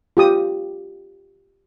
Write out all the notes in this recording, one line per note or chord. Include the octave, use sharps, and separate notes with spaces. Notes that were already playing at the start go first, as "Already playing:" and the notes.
F4 G4 D#6